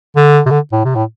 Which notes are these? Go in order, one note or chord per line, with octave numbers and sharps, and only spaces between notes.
D3
C3
D3
A2
C3
A2